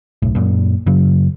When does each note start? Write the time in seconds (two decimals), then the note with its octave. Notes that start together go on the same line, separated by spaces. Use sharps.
0.22 F#1 B1 A2
0.35 F#2 A#2
0.86 F#2 C#3 F#3